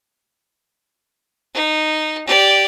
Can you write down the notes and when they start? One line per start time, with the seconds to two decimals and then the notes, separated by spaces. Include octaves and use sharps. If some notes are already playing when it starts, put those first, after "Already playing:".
1.54 D#4
2.27 G4 D5